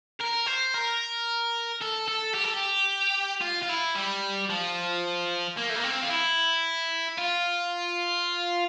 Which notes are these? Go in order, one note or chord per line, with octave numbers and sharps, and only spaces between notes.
A#4
C5
A#4
A4
A4
G4
A4
G4
F4
F4
E4
G3
F3
A#3
A3
A#3
C4
F4
E4
F4